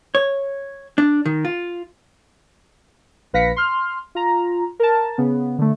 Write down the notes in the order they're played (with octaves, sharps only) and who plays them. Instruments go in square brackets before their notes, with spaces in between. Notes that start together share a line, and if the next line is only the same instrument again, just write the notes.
[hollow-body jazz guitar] C#5
D4
D#3
F4
[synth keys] A#1 B4 F5 A#6 B6 C#7
C6 F6
F4 A#5
A#4 A5
C#3 B3
D3 A3